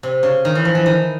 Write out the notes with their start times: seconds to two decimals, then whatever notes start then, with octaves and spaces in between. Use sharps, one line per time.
0.03 C3
0.23 C#3
0.45 D#3
0.55 E3
0.65 F3
0.75 E3
0.86 D#3